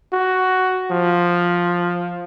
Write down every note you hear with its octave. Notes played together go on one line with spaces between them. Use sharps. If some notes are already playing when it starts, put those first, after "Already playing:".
F#4
F3